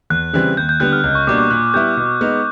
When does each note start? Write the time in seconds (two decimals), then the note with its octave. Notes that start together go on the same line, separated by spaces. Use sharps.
0.10 E2 F#6
0.33 C#3 E3 G3 C4
0.57 D#2 G6
0.69 G6
0.80 D3 G3 B3 F#6
0.93 F6
1.04 C#2
1.15 C#6
1.27 B2 G3 A#3 D4 D6
1.38 D6
1.50 A#2 F#6
1.74 G3 B3 E4 G6
1.97 B2
2.21 G#3 B3 D#4